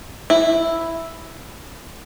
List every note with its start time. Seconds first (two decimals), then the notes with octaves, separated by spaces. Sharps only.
0.30 E4